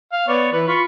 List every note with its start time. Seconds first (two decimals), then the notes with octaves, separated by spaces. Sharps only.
0.13 F5
0.28 B3 C#5 D5
0.52 E3 B4
0.67 F4 B5 C#6